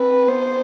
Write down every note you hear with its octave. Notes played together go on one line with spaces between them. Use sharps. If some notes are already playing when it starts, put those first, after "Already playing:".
Already playing: C4 B4
B3 C5